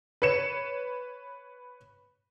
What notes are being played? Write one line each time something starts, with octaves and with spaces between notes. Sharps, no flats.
B4 C#5 C#7 E7